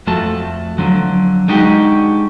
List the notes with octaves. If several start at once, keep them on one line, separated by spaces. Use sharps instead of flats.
F2 F3 A3 F#4 A4 A5
D3 F3 F#3
G3 G#3 D4 D#4 F#4 G4